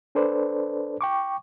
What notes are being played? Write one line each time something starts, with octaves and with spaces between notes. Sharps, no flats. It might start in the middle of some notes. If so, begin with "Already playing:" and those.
D4 A4 B4 C5 D5
G5 C#6 D6